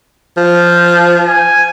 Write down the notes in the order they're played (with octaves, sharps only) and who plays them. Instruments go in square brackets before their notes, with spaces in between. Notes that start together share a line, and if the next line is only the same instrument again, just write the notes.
[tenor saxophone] F3
[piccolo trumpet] G#5